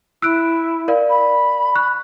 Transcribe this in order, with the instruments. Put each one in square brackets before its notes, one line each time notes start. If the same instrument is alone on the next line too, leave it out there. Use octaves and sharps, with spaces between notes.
[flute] E4 [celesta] E6 F#6 D7
[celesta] A#4 D5 F5
[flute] B5
[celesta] C#6 F#6